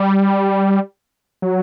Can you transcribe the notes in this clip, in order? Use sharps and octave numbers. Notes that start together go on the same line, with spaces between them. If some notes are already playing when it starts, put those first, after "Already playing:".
Already playing: G3
F#3